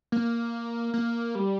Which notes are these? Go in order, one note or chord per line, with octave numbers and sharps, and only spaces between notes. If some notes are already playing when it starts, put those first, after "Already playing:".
A#3
A#3
G3